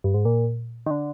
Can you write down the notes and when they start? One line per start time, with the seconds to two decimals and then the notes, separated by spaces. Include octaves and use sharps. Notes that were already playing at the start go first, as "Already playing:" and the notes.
0.04 G2
0.14 G#2
0.25 A#2
0.86 D#3
0.91 D3